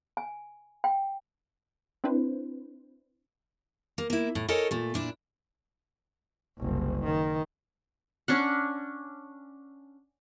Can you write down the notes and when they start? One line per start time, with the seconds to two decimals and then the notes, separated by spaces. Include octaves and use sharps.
0.17 G#5
0.84 G5
2.04 C4 D4 E4 B4 C5
3.98 A#3
4.10 A#3 E4
4.35 A2
4.49 A4 A#4 C#5 D#5 G#5
4.71 A#2 A3
4.94 A#2 D4 E4
6.58 F#1 C2
7.04 D#3
8.28 C#4 D4 F#5